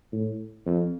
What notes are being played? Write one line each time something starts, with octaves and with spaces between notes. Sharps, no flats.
A2
F2